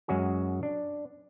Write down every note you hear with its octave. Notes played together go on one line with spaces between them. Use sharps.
F#2 G#3 C#4 F#4 G#4
D4